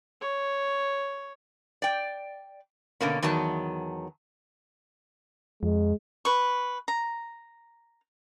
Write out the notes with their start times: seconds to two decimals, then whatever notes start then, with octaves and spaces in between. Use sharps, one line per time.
0.21 C#5
1.82 D5 G5
3.01 B2 D3 A#3 C#4
3.22 E2 D#3 F#3 A5
5.63 F2 G#3
6.25 B4 C#6
6.88 A#5